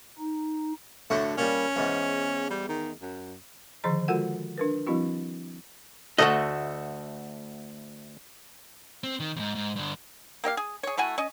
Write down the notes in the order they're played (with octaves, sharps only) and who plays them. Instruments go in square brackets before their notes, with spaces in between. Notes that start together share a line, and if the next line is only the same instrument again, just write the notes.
[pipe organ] D#4
[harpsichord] A2 A3 F#4 [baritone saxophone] D3
[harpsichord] A#2 G3 [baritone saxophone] C#4
[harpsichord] E2 G#2
[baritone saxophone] G3
D#3
F#2
[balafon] D3 D#3 F3 G#4 C5 A#5
G#3 F4 F#4 A4 A#4 F#5
D4 A#4 B4
F3 G3 C4 E4 F#4
[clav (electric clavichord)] D2 A3 F#5 [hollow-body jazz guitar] F#4 A4 D#5
[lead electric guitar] C4
D#3
E2 G#2
G#2
G2 D3
[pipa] A#3 G4 D#5 F5
G#4
G#4 C#5
A3 E4 F#4 G#5
C#4 D#5